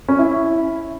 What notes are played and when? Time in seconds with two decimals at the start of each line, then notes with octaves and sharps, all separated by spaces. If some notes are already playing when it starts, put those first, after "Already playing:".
0.08 C#4
0.19 E4